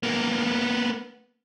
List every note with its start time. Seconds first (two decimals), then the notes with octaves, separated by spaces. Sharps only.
0.03 A#3 B3